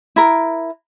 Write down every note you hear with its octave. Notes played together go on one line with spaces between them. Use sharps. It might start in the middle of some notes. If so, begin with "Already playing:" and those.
E4 A#4